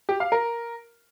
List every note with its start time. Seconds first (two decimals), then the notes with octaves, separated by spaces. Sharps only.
0.09 G4
0.20 F5
0.32 A#4